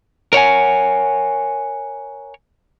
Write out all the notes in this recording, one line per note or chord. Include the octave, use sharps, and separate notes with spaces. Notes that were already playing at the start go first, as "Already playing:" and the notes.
A#4 C#5 F#5 G#5